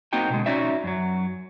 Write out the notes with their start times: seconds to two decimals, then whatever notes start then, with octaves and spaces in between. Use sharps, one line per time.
0.13 A#3 C4 D#4 F#4 G5
0.30 B2 D3 G#3
0.46 C#4 D#4 F#4 D5 E5
0.84 F#2 F#3